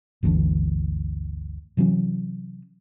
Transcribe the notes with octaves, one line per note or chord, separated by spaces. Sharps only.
G1 D2 E3 D4
C3 E3 F#3 C#4